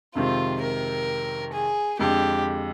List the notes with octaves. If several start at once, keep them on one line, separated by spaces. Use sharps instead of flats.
F2 C3 D#3 G#3 C4 F4
A#4
G#4
F2 D3 G#3 G4